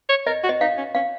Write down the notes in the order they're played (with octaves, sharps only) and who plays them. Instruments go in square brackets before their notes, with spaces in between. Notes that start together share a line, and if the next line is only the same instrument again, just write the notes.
[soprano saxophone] C#5
[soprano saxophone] A#4 [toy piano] D#5
[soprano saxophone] F#4
[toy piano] D#5
[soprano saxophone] D#4 [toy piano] F5
[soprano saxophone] C#4
[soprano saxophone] C#4 [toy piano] F5